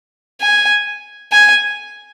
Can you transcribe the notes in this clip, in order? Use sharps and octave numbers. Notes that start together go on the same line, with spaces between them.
G#5
G#5